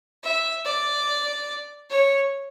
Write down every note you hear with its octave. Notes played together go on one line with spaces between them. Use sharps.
E5
D5
C#5